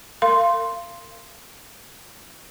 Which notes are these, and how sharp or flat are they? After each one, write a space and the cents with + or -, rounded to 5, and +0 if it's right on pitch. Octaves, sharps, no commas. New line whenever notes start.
A#4 -35 F5 -25 C6 +0